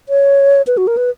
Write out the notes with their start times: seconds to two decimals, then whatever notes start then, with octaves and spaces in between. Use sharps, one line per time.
0.09 C#5
0.67 B4
0.77 F#4
0.87 A#4
0.97 B4